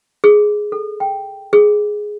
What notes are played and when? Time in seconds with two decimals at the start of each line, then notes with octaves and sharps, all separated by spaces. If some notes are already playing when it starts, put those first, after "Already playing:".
0.24 G#4
0.72 A4
1.00 G5
1.53 G#4